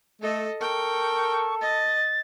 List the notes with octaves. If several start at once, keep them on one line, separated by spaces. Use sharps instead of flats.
A3 A4 D#5
A4 A#4 G5 C#6
D#5 A6